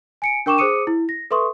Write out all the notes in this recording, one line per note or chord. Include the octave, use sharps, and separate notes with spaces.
G#5 C#7 D7
D4 A#4 G5 C#6 D6 E7
G#4 C5 D6 D#6 C#7 D#7
E4
A#6
A4 B4 E5 C6 C#6 D#6